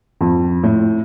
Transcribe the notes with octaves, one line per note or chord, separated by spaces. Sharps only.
F2
A2